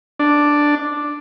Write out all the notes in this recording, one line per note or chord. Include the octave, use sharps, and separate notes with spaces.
D4